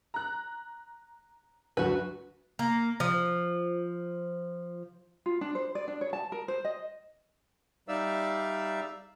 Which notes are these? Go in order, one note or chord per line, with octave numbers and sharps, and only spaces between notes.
A#5 F#6
D2 G2 F#3 F#4 B4
A#3
F3
F4
D4
C5
D5
D4
C#5
A5
A#4
C5
D#5
G3 D#4 D5 E5 F5 E6